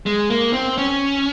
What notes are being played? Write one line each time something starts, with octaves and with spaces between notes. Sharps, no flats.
G#3
A#3
C4
C#4